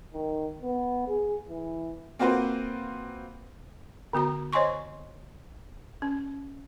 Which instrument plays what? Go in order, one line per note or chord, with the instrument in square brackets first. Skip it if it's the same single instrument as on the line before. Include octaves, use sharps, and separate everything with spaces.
[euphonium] D#3
B3
G#4
E3
[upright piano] A#3 C4 F4 F#4 B4 C5
[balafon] D3 B3 F#4 A#5
C5 C#5 D#5 G#5 C6 C#6
C#4